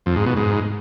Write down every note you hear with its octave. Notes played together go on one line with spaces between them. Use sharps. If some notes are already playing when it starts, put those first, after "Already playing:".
F2
G#2
B2
G#2